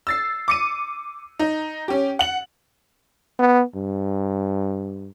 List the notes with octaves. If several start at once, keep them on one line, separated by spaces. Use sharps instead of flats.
E6 A6 C7
D6 C#7 D#7
D#4
C#4 G4
F#5 F#7
B3
G2